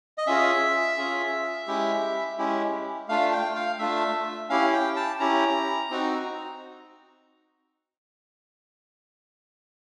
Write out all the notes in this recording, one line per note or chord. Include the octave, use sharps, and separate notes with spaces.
D#5
C#4 F4 G#4 E5
C#4 F4 G#4
G#3 C#4 E4 G4
G#3 C#4 E4 G4
A3 D4 F4 F5
G5
F5
A3 D4 F4 E5
C#4 E4 G4 F5
G5
A5
C#4 E4 G4 A#5
C4 D#4 F#4